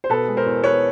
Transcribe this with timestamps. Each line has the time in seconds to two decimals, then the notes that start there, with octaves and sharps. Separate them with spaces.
0.04 C5
0.10 B2 A4 B4
0.28 G#3
0.37 A#4 C5
0.46 E2
0.64 B3 B4 C#5